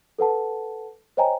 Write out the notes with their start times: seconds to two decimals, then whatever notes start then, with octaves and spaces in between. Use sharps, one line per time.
0.18 A4 B4 F#5 A5
1.17 C5 C#5 D#5 G5 G#5 A#5